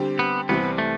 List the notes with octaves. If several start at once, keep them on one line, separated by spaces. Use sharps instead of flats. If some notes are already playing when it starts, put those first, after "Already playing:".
Already playing: D3 G3 C4 G4
B3
C2 C3 E3 G3 B3 C4
A3